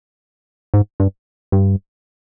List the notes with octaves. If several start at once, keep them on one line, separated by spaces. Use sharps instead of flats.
G#2
G2
G2